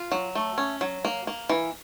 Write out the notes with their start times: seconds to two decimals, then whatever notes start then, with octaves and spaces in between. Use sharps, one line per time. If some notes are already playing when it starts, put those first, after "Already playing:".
Already playing: F4
0.12 F#3
0.35 A3
0.58 C#4
0.81 F#3
1.05 A#3
1.27 A#3
1.49 E3